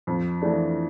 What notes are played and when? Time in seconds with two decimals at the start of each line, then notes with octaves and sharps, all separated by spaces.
0.07 F2
0.41 E3 A3 D4